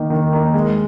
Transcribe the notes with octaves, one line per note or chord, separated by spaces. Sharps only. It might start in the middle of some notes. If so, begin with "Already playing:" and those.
Already playing: D#3 A#3 D#4
D#3
A#3 D#4
G#3